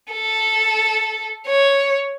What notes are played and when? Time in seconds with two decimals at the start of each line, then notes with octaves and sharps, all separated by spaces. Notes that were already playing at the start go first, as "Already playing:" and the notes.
0.12 A4
1.47 C#5